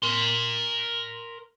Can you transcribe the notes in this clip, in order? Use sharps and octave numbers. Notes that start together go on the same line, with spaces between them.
A#4 C6